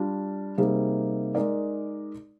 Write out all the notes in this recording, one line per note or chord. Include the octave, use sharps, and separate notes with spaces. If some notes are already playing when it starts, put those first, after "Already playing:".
Already playing: G3 D4 F4
C3 G3 A#3 D#4 G#4
G#3 D#4 A#4 D5